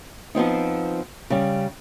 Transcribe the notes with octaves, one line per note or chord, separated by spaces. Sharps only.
F3 B3 C4 D#4
C#3 G3